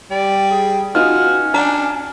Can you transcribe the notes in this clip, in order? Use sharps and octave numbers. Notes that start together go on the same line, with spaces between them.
G3 D5
G#4
B3 C#4 D#4 F4 F#4 F6
D4 G5 A#5